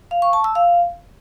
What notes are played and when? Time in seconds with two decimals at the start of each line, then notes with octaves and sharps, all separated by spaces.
0.11 F5
0.22 C#6
0.33 A5
0.44 E6
0.55 F5